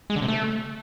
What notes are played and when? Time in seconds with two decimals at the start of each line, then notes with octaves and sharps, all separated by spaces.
0.10 G#3
0.16 D3
0.22 C3
0.28 A3